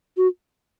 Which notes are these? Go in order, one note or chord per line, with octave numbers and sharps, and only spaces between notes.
F#4